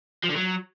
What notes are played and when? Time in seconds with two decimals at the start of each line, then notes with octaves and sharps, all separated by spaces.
0.24 F3
0.30 D3
0.36 F#3